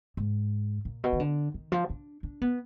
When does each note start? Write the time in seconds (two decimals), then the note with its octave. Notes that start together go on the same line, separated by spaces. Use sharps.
0.17 G#2
0.85 A#2
1.04 B2
1.13 D#3
1.20 D3
1.54 D#3
1.72 F3
1.90 D4
2.23 D4
2.42 B3